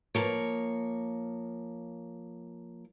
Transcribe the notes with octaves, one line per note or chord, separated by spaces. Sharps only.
F3 A#3 C#5